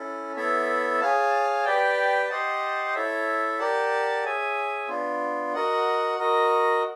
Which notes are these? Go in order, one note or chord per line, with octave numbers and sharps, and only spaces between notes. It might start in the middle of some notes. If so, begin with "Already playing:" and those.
Already playing: C#4 E4 A4
B3 E4 A4 C#5 E5
G#4 C#5 F5 A5
G4 B4 D5 G5
G4 C5 D#5 F#5 A5
E4 A4 C#5 E5
G4 A#4 D5 F#5 A5
G#4 C#5 E5 G#5
B3 D4 F4
F#4 A#4 D#5 F#5
F#4 A#4 D#5